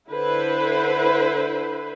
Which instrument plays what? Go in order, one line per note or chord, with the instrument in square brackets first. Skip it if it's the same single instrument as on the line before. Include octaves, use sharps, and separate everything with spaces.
[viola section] D3 E4 B4 C5